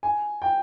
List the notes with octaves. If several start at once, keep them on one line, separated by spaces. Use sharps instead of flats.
G#5
G5